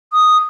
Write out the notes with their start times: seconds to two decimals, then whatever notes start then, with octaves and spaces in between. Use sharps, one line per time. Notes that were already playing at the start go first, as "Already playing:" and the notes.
0.13 D#6